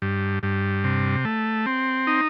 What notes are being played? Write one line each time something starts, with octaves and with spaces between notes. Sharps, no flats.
G2
G2
C3
A3
C4
D#4